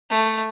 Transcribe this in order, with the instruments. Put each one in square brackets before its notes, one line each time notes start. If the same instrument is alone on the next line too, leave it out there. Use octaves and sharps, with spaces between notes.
[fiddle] A3